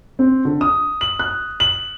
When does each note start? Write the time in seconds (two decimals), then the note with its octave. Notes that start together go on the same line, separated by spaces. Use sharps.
0.19 C4
0.45 D3
0.61 D#6
1.01 F#7
1.19 F#6
1.60 F#7